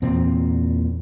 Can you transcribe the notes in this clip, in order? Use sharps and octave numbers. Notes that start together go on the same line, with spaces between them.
E2 A#2 C4